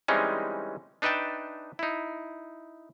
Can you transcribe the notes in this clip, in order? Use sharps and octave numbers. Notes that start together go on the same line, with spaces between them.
E3 G3 G#3 C4 C#4 D#4
D4 D#4 B4 E5 G5 A5
D#4 E4